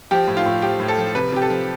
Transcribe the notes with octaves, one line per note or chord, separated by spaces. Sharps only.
F3 G4
A2
F4
A2
F3 G4
A2
A4
F3
C3 B4
C3 G4
A4
F3